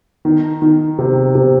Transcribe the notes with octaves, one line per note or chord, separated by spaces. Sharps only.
D#3
D#3
C3
C3